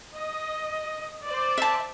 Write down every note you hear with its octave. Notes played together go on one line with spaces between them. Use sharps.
D#5
C5 D5
E5 A5